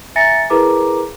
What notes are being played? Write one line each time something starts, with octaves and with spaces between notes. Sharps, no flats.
E5 G#5 A#5 A6 A#6 C#7
E4 G#4 A#4 B4 A#5 D6